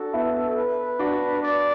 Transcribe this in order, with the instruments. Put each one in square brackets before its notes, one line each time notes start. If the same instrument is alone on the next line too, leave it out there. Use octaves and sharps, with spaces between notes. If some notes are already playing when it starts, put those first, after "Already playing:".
Already playing: [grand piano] D4 F#4 [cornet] A4
[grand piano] B3 E4
[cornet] B4
[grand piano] D4 F#4
[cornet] D5